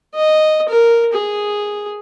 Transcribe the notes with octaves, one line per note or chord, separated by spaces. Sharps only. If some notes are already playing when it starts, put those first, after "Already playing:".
D#5
A#4
G#4